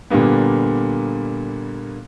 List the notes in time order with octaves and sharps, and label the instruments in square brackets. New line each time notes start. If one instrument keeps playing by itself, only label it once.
[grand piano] A#2 D3 G3 A#3 B3